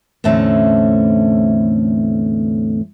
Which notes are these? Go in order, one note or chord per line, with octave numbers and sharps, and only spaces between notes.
E2 A2 D3 A3 C4 C#4